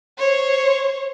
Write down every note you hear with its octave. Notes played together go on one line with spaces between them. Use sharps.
C5 C#5